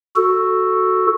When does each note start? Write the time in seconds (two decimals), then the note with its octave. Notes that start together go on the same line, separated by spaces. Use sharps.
0.16 F#4 A4